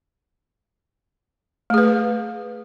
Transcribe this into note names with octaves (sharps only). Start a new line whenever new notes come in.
A3 G#4 B4